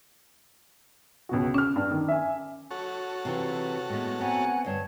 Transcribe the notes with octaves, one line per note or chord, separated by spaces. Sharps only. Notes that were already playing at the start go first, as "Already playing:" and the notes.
C#2 B2 F#4
C#4 D6 F6
G2
D#3
E5 G#5
F#4 A4 C#5
C3 E3 F4
A2 G#3 B3
B3 C4 F#5 G#5 A#5
D2 G2 C#5 A5 G#6